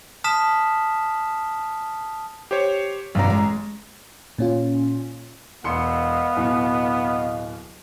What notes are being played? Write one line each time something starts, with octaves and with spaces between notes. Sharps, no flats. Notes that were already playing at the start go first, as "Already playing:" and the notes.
A5 D#6 F6 B6 E7
G4 C5 C#5
A1 G2 B2 D5 A#5
G#3
A#2 C#4 F4
E1 B3 D#5 F5 C6 C#7
D1 B2